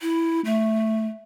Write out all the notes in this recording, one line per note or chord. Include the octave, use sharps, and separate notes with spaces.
E4
A3